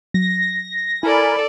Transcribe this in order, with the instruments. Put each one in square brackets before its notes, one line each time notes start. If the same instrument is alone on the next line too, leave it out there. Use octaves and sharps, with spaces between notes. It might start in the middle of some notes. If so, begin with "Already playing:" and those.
[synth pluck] F#3 [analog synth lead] A#6
[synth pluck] E4 [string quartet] A4 D5 [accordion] A#4 G#5 B5